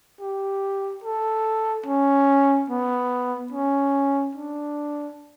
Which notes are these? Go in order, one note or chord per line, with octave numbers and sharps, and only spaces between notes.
G4
A4
C#4
B3
C#4
D4